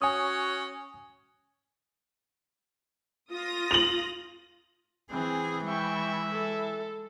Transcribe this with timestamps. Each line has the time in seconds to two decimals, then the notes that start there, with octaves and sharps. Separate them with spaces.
0.02 C#4 F#4 C#5 G#5 D#6
3.31 F4 D#6 A#6
3.71 F7 F#7
5.11 E3 C4 G#4
5.68 G#3 E4 E5 G5 C#6
6.32 A4